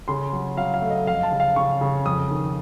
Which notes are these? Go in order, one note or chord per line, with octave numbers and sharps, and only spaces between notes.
C#3 C6
F#3
F#3 F5
F5
A3
D#5
F2 F5
A5
C#3
F5
C#3 C#6
C#3
F2 D#6
D#3